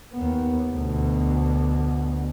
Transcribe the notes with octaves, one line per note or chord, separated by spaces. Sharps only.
D#2 B3
D2 B2